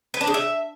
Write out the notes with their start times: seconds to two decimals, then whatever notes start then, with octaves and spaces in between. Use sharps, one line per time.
0.14 B4
0.21 D4
0.27 G#4
0.34 E5